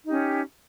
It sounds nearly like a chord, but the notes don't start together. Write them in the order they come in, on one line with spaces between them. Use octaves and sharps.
D#4 G4 C#4